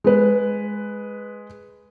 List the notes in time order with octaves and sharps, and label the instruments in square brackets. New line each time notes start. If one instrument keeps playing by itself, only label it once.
[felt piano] G#3 B4